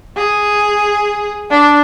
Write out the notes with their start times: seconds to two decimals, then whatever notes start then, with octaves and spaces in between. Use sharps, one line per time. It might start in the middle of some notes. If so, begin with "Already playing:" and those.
0.17 G#4
1.50 D4